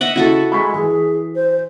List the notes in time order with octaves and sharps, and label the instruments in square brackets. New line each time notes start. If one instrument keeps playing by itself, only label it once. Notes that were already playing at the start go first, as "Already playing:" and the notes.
[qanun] D#5 E5 F#5
[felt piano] C#3 [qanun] E4 F#4 A4
[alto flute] G#3 [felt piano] B5 C#6 B6
[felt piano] E3 [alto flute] G#4
[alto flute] C5